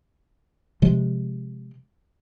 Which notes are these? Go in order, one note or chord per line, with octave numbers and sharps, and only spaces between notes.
C3 F3 G#3